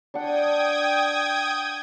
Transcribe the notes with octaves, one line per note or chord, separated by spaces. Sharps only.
D4 F#5 G5 D#6 G#6